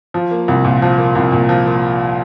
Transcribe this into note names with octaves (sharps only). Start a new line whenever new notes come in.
F3
A#3
C2
A#2
F3
A#3
C2
A#2
F3
A#3